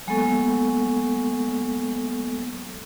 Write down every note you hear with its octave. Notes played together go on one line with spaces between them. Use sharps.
F#3 G#3 A#3 B3 A4 C#6